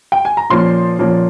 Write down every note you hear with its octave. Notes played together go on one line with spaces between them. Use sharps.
G5
G#5
A#5
A#2 F3 A#3 C#4 C6
A#2 F3 A#3 C#4